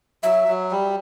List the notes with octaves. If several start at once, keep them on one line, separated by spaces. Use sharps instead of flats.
F#3 E5
F#3
G3